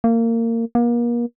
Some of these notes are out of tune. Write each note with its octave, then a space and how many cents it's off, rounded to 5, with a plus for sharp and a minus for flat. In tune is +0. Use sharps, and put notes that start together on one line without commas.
A#3 -25
A#3 +35